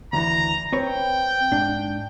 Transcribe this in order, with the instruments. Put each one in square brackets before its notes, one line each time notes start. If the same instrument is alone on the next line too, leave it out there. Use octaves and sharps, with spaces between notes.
[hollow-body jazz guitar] D2 E3 [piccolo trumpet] A#5
[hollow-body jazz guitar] C4 B4 C#5 [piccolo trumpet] G5
[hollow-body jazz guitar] G#2 D4